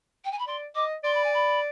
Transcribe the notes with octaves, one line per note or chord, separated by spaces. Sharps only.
G5
G#5
B5
D5 C6
D#5 D6
D5 C6
B5
G#5
B5